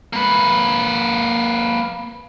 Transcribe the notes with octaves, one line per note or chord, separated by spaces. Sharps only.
A#3 B4